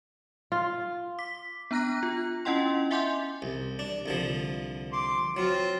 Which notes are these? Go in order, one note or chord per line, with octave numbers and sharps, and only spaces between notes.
F4
D6 B6
B3 D4 A#5 F#6 A#6
F4
C#4 E4 D#5 F#5 G5 C6
E5 F#5 G#5 C6 D6 G6
C2
D4
C2 D3 F3
C6 D6
F#3 C4 F4